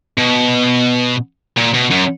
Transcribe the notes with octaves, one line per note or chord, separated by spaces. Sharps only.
B2
A#2
B2
F#2